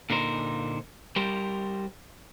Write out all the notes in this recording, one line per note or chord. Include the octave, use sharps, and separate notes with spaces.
A#2 D3 D#4 A#4 C5
G3 G4 A#4 C5